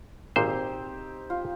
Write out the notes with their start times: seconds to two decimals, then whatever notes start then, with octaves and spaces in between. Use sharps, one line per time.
0.36 G#1 A#2 C4 D#4 G4 C5
1.30 F4